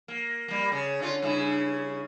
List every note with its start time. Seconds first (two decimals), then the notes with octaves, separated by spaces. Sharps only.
0.08 A#3
0.48 G3 A#3
0.72 C#3
1.00 D3 C#4 F4
1.22 G2 C#3 E4